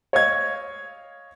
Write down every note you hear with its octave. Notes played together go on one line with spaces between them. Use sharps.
C#5 D#5 F5 G#6